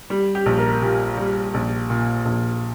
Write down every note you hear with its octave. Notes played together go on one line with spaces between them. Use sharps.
G3
G4
A#1
A#4
A#2 G4
G3
A#1
A#2
A#1